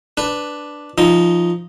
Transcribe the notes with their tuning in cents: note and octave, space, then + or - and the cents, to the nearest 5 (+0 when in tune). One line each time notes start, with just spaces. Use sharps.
D4 +0 B4 +0
F3 -10 D#4 +0